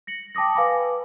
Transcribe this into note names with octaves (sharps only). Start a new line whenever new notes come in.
A#6 C#7 F#7
G5 A5 D6 D#6 A#6
B4 F5 G#5 B5 D6